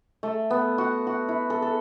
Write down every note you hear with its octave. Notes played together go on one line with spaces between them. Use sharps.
A3
B3
F#4
F#4
E4
A4
A4